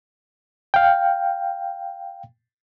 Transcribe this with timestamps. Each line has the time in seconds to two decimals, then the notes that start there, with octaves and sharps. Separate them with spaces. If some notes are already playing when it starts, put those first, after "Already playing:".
0.74 F5 G5